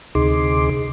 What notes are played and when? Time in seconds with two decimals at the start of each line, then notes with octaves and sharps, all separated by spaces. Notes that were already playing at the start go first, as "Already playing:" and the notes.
0.15 D2 C3 D#4 G#4 C6 D6